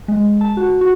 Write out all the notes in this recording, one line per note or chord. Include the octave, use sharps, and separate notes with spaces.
G#3
A5
F#4
F#4